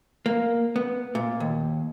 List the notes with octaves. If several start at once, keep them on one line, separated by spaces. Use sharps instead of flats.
A#3
B3
A#2
D#2